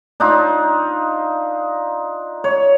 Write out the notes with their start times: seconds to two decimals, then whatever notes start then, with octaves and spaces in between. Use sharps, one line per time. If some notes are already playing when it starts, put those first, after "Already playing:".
0.20 D4 D#4 F4
2.44 C#5